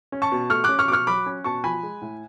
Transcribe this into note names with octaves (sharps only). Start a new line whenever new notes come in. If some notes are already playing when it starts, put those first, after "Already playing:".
C#4
A5 C#6
B2
A3 C#6 F6
C#4 D6 F#6
C#6 F6
B2 C#6 D6 F6
F#3 B5 D6
C#4
B2 A5 C#6
F3 G#5 B5
G#3
A2